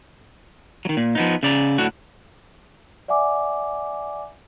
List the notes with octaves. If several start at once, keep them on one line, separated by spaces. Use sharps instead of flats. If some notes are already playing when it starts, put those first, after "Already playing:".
D#3 F#3
A#2
F3 B3 D#4
C#3 D5 A#5
A2 D3 F#4
D5 E5 F#5 G#5 D6